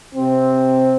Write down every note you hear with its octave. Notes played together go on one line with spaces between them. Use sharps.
C3 C4